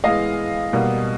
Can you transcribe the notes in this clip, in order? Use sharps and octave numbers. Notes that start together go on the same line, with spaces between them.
A2 E3 G#3 B3 D#5 F5
B2 G3 A#3